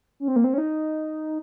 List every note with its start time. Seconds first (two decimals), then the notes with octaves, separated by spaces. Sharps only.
0.20 C#4
0.28 C4
0.36 A#3
0.44 C4
0.54 C#4
0.58 D#4